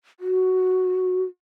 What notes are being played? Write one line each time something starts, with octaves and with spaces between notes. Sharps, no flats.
F#4